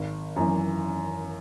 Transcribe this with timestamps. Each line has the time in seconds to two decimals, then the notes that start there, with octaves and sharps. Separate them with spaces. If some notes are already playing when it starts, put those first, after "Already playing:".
Already playing: G#1
0.36 F#2 E3